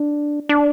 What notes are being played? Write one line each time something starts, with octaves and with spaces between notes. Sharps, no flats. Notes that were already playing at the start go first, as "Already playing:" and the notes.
Already playing: D4
D4